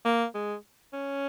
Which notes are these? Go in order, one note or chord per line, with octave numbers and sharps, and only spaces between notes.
A#3
G#3
C#4